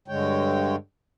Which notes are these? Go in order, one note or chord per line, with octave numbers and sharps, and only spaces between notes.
G2 D3 G#3 C#5 G5